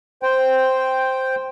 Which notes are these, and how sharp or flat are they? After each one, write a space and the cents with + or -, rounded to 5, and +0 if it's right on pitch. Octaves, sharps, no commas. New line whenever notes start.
C5 +0 G5 +0